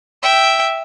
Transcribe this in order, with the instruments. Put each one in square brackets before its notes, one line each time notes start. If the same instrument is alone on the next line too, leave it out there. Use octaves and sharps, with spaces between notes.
[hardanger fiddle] E5 G5